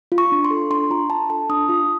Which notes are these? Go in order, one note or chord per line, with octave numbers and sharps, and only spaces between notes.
F4
C#6
D4
C6
A4
D4 C6
F4 A#5
D4 A5
A4 A5
D4 D#6
F4